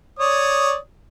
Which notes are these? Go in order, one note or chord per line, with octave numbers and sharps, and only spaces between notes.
C#5 D5 D#6